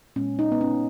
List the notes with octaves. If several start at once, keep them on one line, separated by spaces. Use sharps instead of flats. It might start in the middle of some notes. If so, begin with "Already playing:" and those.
A#2 G#3 B3 C#4
D#4
B3
C#4